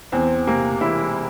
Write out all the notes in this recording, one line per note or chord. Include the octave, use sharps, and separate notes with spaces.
E2 C4
C3 A#3
E1 E4